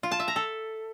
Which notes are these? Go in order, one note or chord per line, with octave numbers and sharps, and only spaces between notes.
F4
A5
E5
A#5
A4